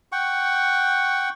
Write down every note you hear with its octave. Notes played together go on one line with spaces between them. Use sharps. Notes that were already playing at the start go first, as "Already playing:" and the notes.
F#5 G5 C#6